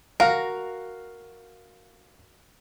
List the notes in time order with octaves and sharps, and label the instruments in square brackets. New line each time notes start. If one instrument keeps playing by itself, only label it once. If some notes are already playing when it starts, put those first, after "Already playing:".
[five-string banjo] F#4 A#4 [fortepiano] F5